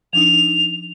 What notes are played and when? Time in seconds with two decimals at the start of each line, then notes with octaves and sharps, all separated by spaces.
0.13 F3 D4 D#4 F7